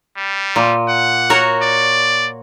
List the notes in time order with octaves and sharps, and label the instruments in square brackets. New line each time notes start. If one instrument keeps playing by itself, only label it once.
[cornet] G3
[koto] A#2
[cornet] F#5
[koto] F#4 A#4 C#5
[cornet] D5